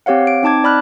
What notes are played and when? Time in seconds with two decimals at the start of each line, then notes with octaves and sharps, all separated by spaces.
0.06 C4 G4 C#5 F5 F#5
0.27 D7
0.43 C4 D#4 A5 D6 G#6
0.64 D5 B5 F6 F#6